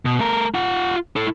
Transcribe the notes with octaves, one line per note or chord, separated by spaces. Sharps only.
B2
A3 A#4
F4 F#5
E4 A4